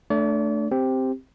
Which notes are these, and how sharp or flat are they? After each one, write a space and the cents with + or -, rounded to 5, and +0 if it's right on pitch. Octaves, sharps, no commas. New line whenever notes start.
A3 +0 D4 +10 D5 -40
C4 +0 G4 +0